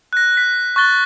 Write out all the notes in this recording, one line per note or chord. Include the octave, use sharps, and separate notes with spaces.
F#6 A#6
B6
C#6 F#6 A6 G7